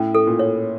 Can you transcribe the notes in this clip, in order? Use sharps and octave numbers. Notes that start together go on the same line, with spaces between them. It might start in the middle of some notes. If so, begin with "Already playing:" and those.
Already playing: A2 C#4
A4
A#2
C#5